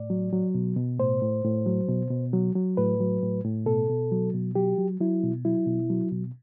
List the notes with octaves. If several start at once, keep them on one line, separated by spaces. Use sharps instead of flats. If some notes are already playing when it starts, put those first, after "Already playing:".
Already playing: A2 D5
F#3
F#3
B2
B2
A2 C5
A2
A2
F#3
B2
B2
F#3
F#3
A2 B4
F#3
A2
A2
B2 A4
B2
F#3
B2
F#3 G4
F#3
F#3 E4
B2
F#3 E4
B2
F#3
B2